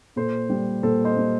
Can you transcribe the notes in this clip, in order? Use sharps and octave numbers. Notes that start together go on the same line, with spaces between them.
A#2 A4 C5
G3
A#2 A4 C5
C5 D#5
G3